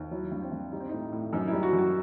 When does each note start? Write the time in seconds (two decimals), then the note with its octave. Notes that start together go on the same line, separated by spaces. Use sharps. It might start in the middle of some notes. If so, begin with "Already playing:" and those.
Already playing: D#2
0.11 F#3 E4
0.32 G2
0.42 C4
0.52 G2
0.72 G3 D#4
0.80 C4
0.89 A2 D#4
1.12 A2
1.33 F#2 D#4
1.48 G3 E4
1.63 F#4
1.73 F#2
1.79 F#4